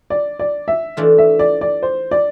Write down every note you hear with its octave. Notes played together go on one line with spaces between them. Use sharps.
D5
D5
E5
E3 A3 D4 F4
E5
D5
D5
C5
D5